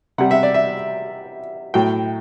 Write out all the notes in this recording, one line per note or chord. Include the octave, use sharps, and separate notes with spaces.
C3 G3 F#5
E5
D5
E5
A2 F#3 G5